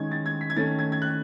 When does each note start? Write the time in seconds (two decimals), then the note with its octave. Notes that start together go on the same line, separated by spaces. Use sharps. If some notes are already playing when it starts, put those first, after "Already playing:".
Already playing: D#3 G#3 C#4 G#6
0.11 A6
0.26 G#6
0.41 B6
0.50 G#6
0.57 D#3 A3 C#4 A6
0.79 G#6
0.92 G#6
1.02 F#6